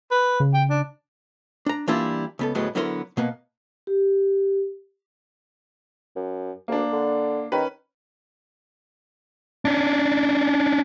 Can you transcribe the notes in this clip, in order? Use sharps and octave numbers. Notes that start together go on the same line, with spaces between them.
B4
C#3
G5
D4
D4 A#5
E3 G3 A#3 D4 E4 F4
C#2 B3 A4
D2 A2 F#3 G#3 B3
D3 F#3 B3 E4 A#4 C6
B2 A#3 B3
G4
F#2
D2 A#3 D4
D3
D#3 C#4 B4
C#4 D4